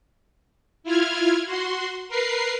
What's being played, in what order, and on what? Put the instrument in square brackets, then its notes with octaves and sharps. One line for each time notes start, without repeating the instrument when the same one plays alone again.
[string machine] E4 F4 F6 G#6
F#4 C6
A#4 B4 C7